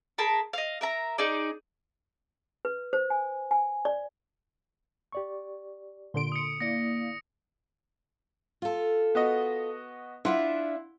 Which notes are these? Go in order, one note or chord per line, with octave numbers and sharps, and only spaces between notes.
G#4 A#4 A5 B5
D#5 F5
A#4 E5 A#5
D#4 G#4 D5
B4
C5
G#5
G#5
D5
G4 D5 C#6
A#2 D3 C6 D7
D#6 C#7
A#3 E4 D5 D#6 A#6 C#7
F4 A4
B3 F#4 D#5
D4 E4 F4 E5 F#5 C6